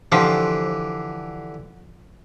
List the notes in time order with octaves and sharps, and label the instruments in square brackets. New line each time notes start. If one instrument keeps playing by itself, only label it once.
[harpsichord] D3 E3 G4 [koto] F3